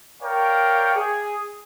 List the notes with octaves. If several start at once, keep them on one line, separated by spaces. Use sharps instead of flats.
A#4 C#5 D5 F5 G5
G#4